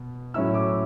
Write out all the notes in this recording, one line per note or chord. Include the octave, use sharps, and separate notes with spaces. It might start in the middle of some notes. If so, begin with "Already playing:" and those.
Already playing: B2
A2 F#3 C#4 E4 E6
D6